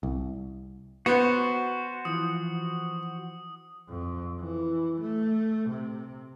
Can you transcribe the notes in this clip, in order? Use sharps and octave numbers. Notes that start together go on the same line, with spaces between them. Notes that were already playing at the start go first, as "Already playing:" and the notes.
C2
B3 F#4 C5
E3 F3 D#6
F2
E3
A3
C3